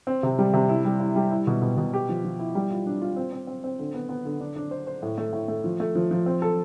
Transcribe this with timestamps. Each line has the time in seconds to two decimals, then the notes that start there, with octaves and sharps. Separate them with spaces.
0.07 C4
0.23 C3
0.39 G3
0.53 C3
0.69 E4
0.85 G3
1.00 E4
1.16 G3
1.31 E4
1.47 B2
1.62 B2
1.77 B2
1.94 G4
2.09 F3
2.24 F3
2.39 E4
2.55 G3
2.71 F4
2.86 D4
3.02 F4
3.16 C4
3.33 C4
3.47 C4
3.64 C4
3.79 D3
3.94 B3
4.09 B3
4.25 D3
4.40 D4
4.56 D4
4.71 C5
4.87 C5
5.03 A2
5.18 A3
5.33 A2
5.48 A3
5.64 F3
5.80 A3
5.95 F3
6.11 F3
6.26 C4
6.42 A4